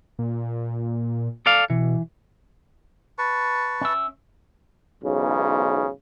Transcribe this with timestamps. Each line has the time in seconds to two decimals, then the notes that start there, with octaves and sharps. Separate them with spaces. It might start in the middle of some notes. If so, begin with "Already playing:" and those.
0.19 A#2
1.46 A4 D5 F5
1.70 B2 E3
3.18 B4 A5 C#6
3.81 C#4 E5
5.03 B1 E2 G#2 C#3